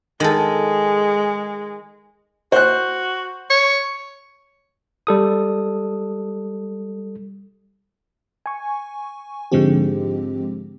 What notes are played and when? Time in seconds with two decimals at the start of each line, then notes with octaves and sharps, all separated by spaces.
0.20 D#3 G#3 A4
2.52 F#4 C5 F#6
3.50 C#5
5.07 G3 A4 D#6
8.46 G#5 C#6
9.52 G#2 D3 F3 G#3 C4 G4